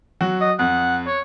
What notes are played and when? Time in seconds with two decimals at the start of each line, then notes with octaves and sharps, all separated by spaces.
0.21 F#3 F#4
0.40 D#5
0.59 F2 F#5
1.06 C#5